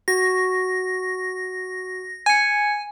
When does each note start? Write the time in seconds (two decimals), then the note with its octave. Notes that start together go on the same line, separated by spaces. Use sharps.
0.08 F#4 A#6
2.26 G#5 G#6 C#7